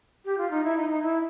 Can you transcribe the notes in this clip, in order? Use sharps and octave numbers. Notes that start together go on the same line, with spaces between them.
G4
F4
D#4
E4
D#4
D#4
E4